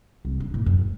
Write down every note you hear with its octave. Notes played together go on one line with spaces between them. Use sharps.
C2
D4
A2
F#2
E1